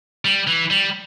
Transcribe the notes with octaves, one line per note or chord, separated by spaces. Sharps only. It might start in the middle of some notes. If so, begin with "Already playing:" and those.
G3
E3
G3